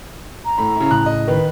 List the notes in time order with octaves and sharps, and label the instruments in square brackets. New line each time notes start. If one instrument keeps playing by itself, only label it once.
[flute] A#5
[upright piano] A2 A3 B5
C#3 E4
[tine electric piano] A2 C#3 [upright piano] F#6
[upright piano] D#5
[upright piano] D#3 [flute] B4